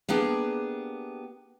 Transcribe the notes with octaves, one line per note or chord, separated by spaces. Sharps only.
A#3 B3 D4 G4 G#4